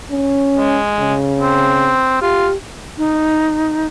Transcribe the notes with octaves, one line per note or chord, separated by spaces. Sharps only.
C#4
G#3
C#3
C4
F4 G4
D#4